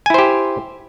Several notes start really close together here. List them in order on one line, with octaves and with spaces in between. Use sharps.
G#5 E4 C5 G4